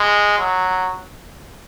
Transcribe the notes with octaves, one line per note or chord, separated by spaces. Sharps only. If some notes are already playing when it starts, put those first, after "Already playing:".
Already playing: G#3
F#3